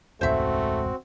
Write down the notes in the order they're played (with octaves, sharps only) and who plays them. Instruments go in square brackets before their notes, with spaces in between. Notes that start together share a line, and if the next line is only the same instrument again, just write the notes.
[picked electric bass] E1 C#2 G#2 [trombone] A3 [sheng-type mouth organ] C4 F#4 [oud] C5 E5